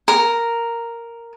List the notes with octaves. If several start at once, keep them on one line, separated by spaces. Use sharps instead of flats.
A#4